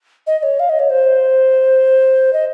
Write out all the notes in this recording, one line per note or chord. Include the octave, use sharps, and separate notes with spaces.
D#5
D#5
C#5
F5
D#5
C#5
C5
D#5